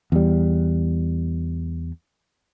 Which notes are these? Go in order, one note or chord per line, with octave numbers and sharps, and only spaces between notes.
E2 G3